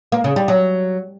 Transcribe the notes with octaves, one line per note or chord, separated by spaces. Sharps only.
A#3
C#3
G3
F#3